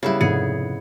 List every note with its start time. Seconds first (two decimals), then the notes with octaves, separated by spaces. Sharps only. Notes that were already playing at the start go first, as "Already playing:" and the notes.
0.03 C#3 G3 B3 E4 G4
0.21 F1 G#2 G#4 C#7